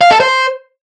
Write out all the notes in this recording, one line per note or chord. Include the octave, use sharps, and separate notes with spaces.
F5
A4
C5